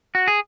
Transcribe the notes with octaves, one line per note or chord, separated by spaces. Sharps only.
F#4
G#4